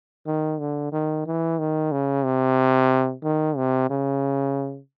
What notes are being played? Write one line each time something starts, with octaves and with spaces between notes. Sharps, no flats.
D#3
D3
D#3
E3
D#3
C#3
C3
D#3
C3
C#3